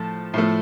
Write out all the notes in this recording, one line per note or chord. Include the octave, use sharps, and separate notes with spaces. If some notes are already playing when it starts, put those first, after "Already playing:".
Already playing: A2 F3 A3 A5
A2 F3 A3